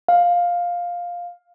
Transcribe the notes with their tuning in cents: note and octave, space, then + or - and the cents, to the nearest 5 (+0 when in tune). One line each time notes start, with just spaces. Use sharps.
F5 +10